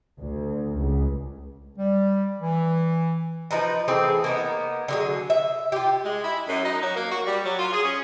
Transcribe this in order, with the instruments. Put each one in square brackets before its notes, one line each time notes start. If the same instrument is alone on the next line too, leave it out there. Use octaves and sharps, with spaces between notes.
[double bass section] D2
C#2
[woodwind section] G3
E3
[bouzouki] F3 D#4 B4
E3 A3 C4 G#4
A#3 B3 D#4
D3 F#3 G#4
E5
F4 G4
[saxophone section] G#3
E4
F#2
D#4
F#3
A#3
F#4
G3
F#3
F4
G#4
C#4